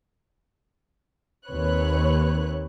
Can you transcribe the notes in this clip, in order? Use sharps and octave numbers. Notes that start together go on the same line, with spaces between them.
D#2 C4 B4 C#5 F#6